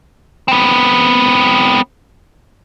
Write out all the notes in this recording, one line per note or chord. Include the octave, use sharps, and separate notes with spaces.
B3 C4